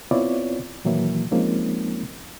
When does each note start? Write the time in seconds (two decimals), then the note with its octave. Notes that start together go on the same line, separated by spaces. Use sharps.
0.11 B3 C4 E4 F4 C#5 D5
0.85 A#2 D#3 E3 F#3 A#3 E4
1.32 F3 G#3 A#3 C4 C#4 D#4